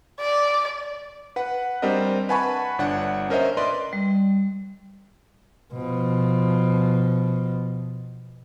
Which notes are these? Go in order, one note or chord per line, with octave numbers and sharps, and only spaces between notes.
D5
B4 F#5
G3 C4 D4 A#4 D#5
B4 F#5 G#5 A5 B5 C#6
G1 D4 F#5
C#4 A#4 C5 D#5 E5
B4 D5 D#5 C6
G3
B2 F3